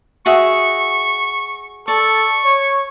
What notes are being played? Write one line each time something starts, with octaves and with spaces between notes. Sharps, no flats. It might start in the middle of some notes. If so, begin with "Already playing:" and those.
F#4 G#4 E5 C#6
A4 D5 C#6
C#5